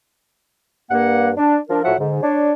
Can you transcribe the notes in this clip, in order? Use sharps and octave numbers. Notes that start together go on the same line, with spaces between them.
G2 A#3 F#5
D4
F3 D4 A#4
A2 F3 F#3 F#4 E5 F#5
G#2 D3
D4 C#5